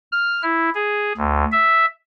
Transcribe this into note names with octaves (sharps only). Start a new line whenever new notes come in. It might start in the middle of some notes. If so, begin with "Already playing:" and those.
F6
E4
G#4
D2
E5